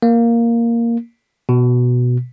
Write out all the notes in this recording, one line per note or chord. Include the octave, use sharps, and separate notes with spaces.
A#3
B2